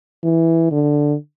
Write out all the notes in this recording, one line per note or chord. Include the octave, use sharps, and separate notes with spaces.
E3
D3